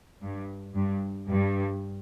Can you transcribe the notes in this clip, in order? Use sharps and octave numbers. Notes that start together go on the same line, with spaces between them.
G2
G2
G2